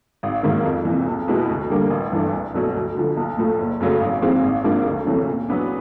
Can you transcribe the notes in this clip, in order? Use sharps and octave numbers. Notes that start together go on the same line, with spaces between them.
G#1
G#2 D#3 F#3 A#3
F2
C3 E3
B1
B2 G#3 B3 E4
D2
D3 G3 A#3 D4
A1
G2 E3 A3 D4
C2
B2 F#3 A3
D2
D3 F3
B1
A2 F3 A3
F#1
F#2 C#3 F#3 A3
G#1
G#2 E3 G#3 C4
G#1
G#2 F3 A#3 D4
D2
C3 E3 A3 C#4
A#2
F#3 B3 D4